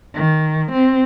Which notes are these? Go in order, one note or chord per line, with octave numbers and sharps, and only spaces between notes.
D#3
C4